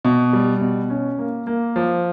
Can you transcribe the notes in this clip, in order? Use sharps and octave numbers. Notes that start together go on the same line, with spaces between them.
B2
G3
B2
C#4
A#3
A#3
F3